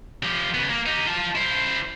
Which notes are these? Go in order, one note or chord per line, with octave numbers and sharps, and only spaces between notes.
F3 G4
C#3 B3
A#3
D#4 G4
F4 A5
E4 C5